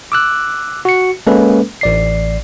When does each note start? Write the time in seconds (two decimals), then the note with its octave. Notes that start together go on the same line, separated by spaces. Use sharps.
0.12 D6 E6 F#6
0.85 F#4 C#7
1.27 G#3 A#3 C#4 A4 B4
1.81 A1 D5 C7